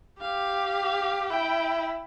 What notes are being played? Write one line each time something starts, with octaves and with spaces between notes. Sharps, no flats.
G4 F5
E4 G5